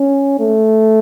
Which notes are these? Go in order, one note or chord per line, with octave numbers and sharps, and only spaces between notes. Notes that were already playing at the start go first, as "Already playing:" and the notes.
Already playing: C#4
A3